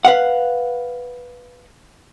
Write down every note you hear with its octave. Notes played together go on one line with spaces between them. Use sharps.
B4 F5 F#5